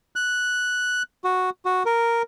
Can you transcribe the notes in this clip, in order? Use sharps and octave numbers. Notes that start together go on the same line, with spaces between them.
F#6
F#4
F#4
A#4